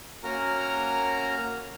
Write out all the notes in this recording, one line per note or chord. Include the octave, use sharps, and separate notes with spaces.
A#3 C#4 F#4 A#4 A#5 F6